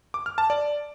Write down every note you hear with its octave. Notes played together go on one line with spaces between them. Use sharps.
D6
F6
A5
D5